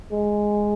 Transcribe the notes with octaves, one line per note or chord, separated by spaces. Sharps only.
G#3